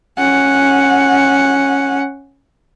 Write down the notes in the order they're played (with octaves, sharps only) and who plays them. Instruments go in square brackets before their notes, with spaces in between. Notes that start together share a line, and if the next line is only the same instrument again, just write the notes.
[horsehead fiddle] C#4 F#5